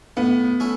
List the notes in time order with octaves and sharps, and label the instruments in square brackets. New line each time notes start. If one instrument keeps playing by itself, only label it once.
[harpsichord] A2 [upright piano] B3
[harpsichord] A3 C#4 E4